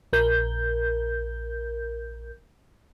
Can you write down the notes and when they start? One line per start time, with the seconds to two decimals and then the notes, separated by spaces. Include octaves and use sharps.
0.13 A#1 A#4 G6